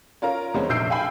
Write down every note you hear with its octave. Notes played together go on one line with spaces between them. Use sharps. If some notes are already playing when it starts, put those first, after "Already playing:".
C#4 F4 A#4 A#5
E2 G3 G#3 C4 C#4
F1 A#1 E6 G6 C7 D7
F5 G5 G#5 B5